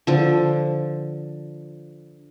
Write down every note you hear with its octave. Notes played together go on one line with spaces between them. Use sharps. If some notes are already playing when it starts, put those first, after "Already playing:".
D3 F3